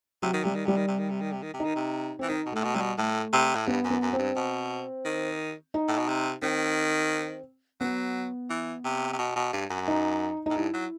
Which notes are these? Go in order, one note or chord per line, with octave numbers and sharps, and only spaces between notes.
C3 F#3
D#3
C3 G3
D#3
C3 G3
D#3
C3
D#3
C3
D#3
C3
D#3
C3
D#3 D#4
C3
E3 C4
D#3 D#4
B2
A2 A3
B2
C3 G3
B2
A2 A3
C3
A2
G2 B3
F#2
B3
F#2
C4
G2
B2
D#3
D#4
A2
B2
C3
D#3 C4
F#3 B3
E3
C3
C3
B2
B2
G2
F#2
D#4
A2 D#4
G2 E4
F#3